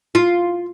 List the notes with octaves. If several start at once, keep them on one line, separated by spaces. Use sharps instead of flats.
F4